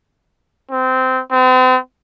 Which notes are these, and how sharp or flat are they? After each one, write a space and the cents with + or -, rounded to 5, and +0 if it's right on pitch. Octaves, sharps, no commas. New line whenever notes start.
C4 -20
C4 -40